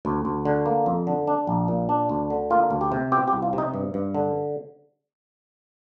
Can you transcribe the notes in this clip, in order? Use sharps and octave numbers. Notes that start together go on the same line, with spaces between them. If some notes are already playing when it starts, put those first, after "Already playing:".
D2
D2
D3
A#3
F2
D3
D4
A#1
A#2
D4
D2
D3
A#3 F4
D2
G4
C3
C4 G4
G4
C2
F4
C3
D#4
G2
G2
D3